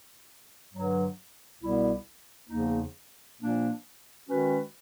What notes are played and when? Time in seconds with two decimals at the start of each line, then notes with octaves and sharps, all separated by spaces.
0.73 G2 D3 F#3
1.61 C2 B2 G3 B3 E4
2.49 E2 C#3 F3 A#3 D#4
3.38 A#2 F3 A#3 D4
4.27 D#3 G#3 C#4 F#4 B4